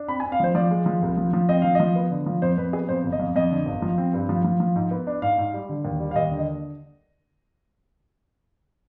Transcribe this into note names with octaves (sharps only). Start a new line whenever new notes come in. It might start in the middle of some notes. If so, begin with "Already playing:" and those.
Already playing: D4
C4 B5
G#5
C4
F5
F3 C5
F3 D5
G#3
F3
C2
F3
F3
C4 D#5
F3 F5
F3 D#5
B3
D3
F3
F2 C5
F2 B4
B3 G#4
F2 C5
G1
D#5
F2
F2 D#5
D3
G1
F3
C4
G2
F3
F3
F3
G#2
B3
D4
G#2 F5
G#2
G3
D3
D#2
G3
F5
D#2 D#5
D3
D#5